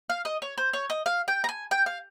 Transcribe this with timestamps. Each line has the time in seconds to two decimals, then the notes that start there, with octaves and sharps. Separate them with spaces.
0.10 F5
0.25 D#5
0.42 C#5
0.58 C5
0.73 C#5
0.90 D#5
1.06 F5
1.28 G5
1.44 A#5
1.49 G#5
1.71 G5
1.86 F5